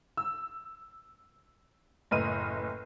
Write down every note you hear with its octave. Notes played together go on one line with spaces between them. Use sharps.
E6
F#1 A2 B4 D#5 F6 D#7